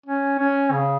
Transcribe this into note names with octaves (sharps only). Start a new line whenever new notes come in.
C#4
C#4
C#3